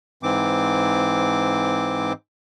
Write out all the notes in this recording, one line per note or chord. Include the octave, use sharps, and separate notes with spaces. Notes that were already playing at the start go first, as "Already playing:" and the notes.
G#2 E3 C4 D6